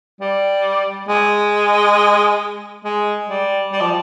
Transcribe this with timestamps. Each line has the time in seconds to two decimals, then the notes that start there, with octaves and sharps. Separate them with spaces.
0.21 G3
1.08 G#3
2.84 G#3
3.29 G3
3.72 G3
3.81 F3